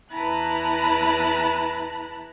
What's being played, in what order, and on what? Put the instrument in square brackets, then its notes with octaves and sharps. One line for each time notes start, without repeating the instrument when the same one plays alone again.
[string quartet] E2 E4 B4 A5 A#5 F#6